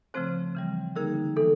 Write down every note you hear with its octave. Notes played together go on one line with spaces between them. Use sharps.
C#3 F3 A3 C4 C5
C#3 E3 G3
D3 G3 A#3 D#4 G#4 A#4
E3 G#3 B3 A4